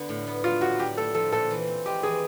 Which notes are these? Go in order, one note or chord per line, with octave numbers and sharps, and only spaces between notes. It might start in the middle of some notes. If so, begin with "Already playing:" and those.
Already playing: D3 B3
A2
B3
F#3 F4
A2 F#4
D4 G4
A3 A4
F3 A4
A#2 A4
E3
C4
G#3 G4
E3 G#4